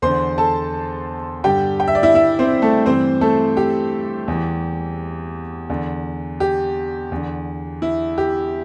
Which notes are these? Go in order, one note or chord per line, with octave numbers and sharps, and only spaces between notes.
E2 D3 C5 C6
A4 A5
G2 D3 G4 G5
G5
E5
D5
E4 E5
E4 E5
C4 C5
A3 A4
G2 E3 C4 C5
A3 A4
G4
E2 E3
E2 D3
G4
E2 D3
E4
G4